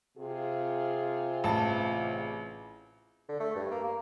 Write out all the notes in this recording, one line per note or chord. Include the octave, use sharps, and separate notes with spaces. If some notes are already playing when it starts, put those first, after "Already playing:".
C3 F4 G#4
A1 A5
D3
A3
G2
A#3
A#3